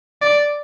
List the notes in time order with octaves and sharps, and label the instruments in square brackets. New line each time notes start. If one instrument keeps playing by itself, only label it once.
[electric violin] D5